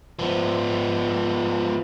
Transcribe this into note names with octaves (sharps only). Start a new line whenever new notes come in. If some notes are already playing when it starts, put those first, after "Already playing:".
F3 B3